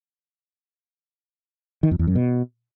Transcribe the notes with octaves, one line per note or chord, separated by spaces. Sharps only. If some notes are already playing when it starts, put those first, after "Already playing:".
D#3
F2
E2
F#2
B2